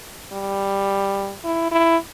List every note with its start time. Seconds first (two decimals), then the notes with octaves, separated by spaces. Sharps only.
0.33 G3
1.44 E4
1.72 E4